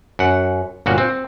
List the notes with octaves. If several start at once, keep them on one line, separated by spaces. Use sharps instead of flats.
F#2 F#5
G1 A#2 F#4
C4